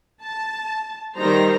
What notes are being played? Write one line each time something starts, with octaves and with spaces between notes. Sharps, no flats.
A5
D#3 G3 D#4 C5 A#5